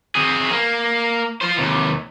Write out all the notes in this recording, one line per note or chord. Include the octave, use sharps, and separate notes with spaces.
C4 G#4
A#3
F4 C5
D#2 C3